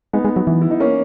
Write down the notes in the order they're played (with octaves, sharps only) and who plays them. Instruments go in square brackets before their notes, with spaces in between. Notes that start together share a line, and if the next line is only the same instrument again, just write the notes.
[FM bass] G#3 [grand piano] B3 D#4
[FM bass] G#3
F#3
E3
[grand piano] E4
D#4
A#3 C#4